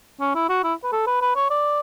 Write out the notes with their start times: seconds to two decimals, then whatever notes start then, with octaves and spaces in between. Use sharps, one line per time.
0.20 C#4
0.35 E4
0.49 F#4
0.64 E4
0.84 B4
0.92 A4
1.07 B4
1.22 B4
1.36 C#5
1.51 D5